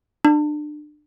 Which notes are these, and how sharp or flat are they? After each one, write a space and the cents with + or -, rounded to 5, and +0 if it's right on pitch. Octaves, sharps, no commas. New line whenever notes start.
D4 +30